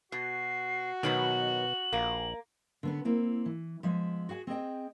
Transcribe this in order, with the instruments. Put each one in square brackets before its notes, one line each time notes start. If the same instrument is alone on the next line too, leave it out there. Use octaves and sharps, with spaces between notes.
[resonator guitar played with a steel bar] B2 [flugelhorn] F#4 [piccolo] C7
[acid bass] B2 [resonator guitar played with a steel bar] D#3 F#3 B3 [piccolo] F#7
[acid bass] A#1 [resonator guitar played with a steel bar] A#3
[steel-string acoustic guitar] D3 A3 B3 C#4 B4
A#3 C4 E4
E3
F3 G#3 B3 E5
F#4 G#4 F#5 G#5
C4 G#4 D#5 G5